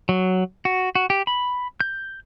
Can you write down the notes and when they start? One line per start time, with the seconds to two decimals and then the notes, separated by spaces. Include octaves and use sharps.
0.09 F#3
0.65 F#4
0.95 F#4
1.10 G4
1.27 B5
1.80 G6